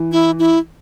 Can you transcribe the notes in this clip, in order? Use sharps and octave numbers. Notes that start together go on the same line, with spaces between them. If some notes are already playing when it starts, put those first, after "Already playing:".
Already playing: E3
E4
E4